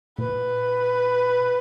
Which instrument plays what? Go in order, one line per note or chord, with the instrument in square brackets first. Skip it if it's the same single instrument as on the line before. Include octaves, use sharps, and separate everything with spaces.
[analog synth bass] A#2 [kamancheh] B4